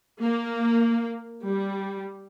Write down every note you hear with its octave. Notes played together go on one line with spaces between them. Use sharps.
A#3
G3